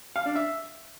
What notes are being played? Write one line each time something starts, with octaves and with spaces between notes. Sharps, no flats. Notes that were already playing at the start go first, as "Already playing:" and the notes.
F5
D4
E5